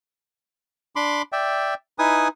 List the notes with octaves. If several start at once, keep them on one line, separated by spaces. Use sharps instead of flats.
D4 B5 C6 D6
D5 E5 G5
D#4 E4 B4 G#5 D#6